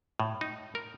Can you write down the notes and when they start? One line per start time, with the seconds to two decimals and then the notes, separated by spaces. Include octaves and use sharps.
0.20 A2
0.41 D#4
0.75 A#4